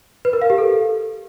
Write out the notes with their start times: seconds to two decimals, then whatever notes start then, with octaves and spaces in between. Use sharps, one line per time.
0.25 B4
0.33 A#4
0.42 F5
0.50 G4
0.58 A4